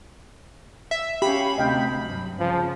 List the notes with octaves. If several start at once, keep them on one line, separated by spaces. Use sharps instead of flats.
E5
C#4 G4 F5 B5
D2 C3 D#5 F5 G5
G2 F#3
C#3 F3